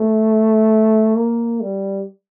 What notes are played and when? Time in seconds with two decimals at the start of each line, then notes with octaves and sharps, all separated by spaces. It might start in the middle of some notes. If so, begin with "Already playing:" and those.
Already playing: A3
1.17 A#3
1.61 G3